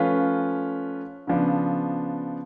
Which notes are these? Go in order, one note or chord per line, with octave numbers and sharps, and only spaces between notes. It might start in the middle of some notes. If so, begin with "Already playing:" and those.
Already playing: F3 A3 C#4 F4 B4
C#3 F3 B3 D4